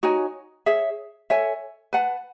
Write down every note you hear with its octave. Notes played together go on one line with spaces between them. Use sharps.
D#4 F#4 C#5 G#5
G#4 C#5 E5
A4 C#5 E5 G#5
B4 F#5 A5